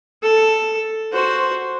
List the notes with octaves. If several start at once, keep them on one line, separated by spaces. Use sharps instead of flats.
A4
F#4 C5